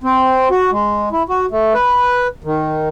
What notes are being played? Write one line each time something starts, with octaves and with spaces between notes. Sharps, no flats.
C4
F#4
G#3
E4
F#4
A3
B4
D#3